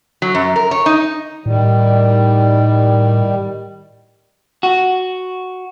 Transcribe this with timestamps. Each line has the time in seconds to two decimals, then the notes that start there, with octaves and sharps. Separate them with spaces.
0.22 F#3
0.35 F#2
0.56 A#4
0.71 C#5
0.86 D#4
1.46 A2 D#3 G3
4.63 F#4